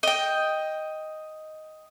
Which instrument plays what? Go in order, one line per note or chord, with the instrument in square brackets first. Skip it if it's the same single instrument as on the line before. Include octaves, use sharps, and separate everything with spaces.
[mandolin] D#5 G5